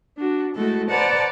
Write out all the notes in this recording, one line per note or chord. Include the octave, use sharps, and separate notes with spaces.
D4 F#4
G#3 A3 E4 F#4 A4
B4 C5 D5 F#5 A5 A#5